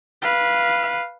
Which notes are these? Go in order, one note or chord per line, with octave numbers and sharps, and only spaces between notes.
B4 F5